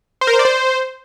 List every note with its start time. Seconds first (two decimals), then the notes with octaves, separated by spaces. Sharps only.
0.21 C5
0.27 A#4
0.33 C5
0.39 D5
0.45 C5